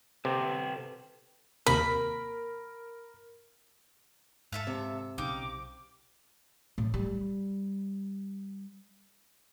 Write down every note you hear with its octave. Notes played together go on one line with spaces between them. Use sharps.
C3 A4 B4 G5
D#2 C3 A#3 A#4 B5
G#2 A4 E5 F5
C3
B1 C#3 D#4 F5 G5 D6
A2
G3